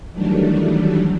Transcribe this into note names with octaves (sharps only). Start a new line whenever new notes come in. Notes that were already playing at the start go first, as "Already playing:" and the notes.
D#3 E3 F#3 G3 A3 D4